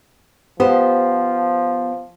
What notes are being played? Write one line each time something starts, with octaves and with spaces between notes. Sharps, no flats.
F3 B3 G4 C5